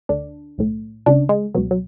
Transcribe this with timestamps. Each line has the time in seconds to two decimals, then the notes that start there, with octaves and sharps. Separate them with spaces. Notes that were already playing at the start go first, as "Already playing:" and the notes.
0.09 D2 D3 D4
0.58 B1 A2
1.06 C#2 C#3 D4
1.29 G#3
1.55 C#2 B2 F#3
1.71 F#3